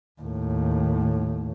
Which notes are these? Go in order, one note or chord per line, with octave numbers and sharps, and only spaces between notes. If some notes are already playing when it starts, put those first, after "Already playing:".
D#2 A2